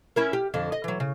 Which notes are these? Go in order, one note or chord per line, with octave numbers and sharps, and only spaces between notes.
C#4 E4 A#4
G4
F2 D3
D#5
E3 F#3
C#3